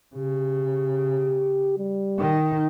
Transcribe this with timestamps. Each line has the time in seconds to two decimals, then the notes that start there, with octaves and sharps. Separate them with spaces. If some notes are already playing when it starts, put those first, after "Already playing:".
0.15 C#3 G4
1.78 G3
2.18 D#3 D#4